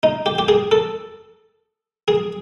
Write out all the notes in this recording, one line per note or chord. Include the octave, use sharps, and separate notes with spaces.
D#4
G4
G4
G#4
A4
G#4